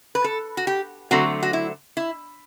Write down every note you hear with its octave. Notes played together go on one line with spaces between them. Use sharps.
B4
A4
F#4
G4
D3 F#3 A3 C4 F#4
F#4
E4
E4